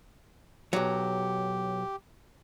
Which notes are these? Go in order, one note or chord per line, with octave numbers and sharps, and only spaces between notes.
B1 F#3 G4